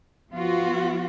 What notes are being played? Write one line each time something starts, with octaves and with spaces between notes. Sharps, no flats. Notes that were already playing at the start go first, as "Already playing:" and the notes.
F3 B3 F4 F#4